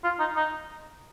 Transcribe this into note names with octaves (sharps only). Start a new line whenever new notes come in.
F4
D#4
D#4